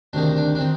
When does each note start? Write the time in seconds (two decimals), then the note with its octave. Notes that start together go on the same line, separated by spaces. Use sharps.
0.13 D2 C3 D#3 A#3 D4
0.36 D4
0.55 D4
0.59 D#3 C4